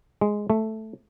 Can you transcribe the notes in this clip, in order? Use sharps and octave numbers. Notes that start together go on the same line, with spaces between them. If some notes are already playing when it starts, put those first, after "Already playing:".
G#3
A3